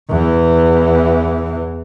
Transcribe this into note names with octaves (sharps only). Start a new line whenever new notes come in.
E2 E3